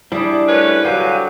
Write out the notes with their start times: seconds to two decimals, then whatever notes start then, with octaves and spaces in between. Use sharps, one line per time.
0.12 G3 D4 E4 G#4 C5
0.48 F#2 A3 C#4 B4
0.85 D3 F#3 G4 C5 F5 G#5